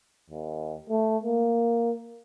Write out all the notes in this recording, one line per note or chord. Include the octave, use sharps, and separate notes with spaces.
D#2
A3
A#3